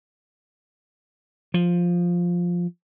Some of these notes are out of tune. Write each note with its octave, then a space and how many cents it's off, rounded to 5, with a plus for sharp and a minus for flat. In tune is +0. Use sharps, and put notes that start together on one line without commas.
F3 +5